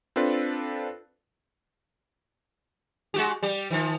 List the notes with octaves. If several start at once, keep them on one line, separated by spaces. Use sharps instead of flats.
C4 D4 F4 A4 B4
G#3 F#4 G4
G3 G4
D#3 F3